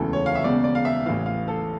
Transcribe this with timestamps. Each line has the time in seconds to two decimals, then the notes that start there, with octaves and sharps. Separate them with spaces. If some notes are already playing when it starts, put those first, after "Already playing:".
Already playing: E1 D2 C#3 E3 A4
0.13 C#5
0.26 F5
0.35 E5
0.44 E1 E2 C#3 D5
0.64 D5
0.75 F5
0.85 E5
1.06 A1 A2 E3 F5
1.26 F5
1.48 A4